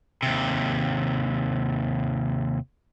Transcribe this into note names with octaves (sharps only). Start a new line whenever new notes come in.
D#2 C3